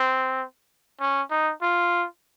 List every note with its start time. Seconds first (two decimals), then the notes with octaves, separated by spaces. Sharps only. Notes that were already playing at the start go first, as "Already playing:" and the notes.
Already playing: C4
1.00 C#4
1.31 D#4
1.62 F4